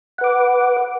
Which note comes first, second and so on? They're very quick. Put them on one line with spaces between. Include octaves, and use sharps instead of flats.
F#5 B4 D6